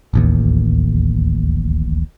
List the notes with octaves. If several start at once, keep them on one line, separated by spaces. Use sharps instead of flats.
D1 A1 D#2